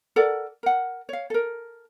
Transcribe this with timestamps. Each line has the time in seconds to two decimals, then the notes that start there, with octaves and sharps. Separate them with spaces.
0.16 A4 A#4 D5 F#5
0.63 A#4 F#5
1.09 C#5 F5
1.30 A4 A#4